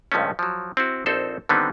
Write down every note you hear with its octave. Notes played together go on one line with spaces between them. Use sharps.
C#2 G2 F3 G#3 A3 C#4
F3 F#3
C4 E4 F#4
A#1 C4 D#4 A4 C5
D3 D#3 G3 B3 C4 D#4